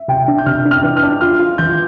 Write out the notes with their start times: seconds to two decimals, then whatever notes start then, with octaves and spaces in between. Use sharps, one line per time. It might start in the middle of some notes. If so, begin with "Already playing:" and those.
Already playing: E5
0.08 C3 G5
0.28 D4
0.38 G6
0.46 C3 F6
0.66 D4
0.71 F6
0.84 E3
0.97 F6
1.03 D4
1.21 F4 F6
1.39 F4
1.58 E3 G6